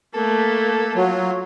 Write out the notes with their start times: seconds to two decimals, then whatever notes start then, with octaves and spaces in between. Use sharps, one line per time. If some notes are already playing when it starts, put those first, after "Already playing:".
0.14 A3 A#3 A4
0.96 F#3 F4